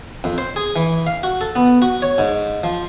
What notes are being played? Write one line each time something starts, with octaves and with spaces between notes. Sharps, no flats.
F2
C5
G#4
E3
F5
F#4
A4
B3
F#4
C#5
G#2
F3